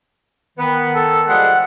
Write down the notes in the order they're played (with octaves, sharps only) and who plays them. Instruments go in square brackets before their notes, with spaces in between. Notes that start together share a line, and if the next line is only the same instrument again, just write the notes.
[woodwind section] D#3 [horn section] B3
[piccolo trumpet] A4
[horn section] F3 G3 G#3 [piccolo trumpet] F#5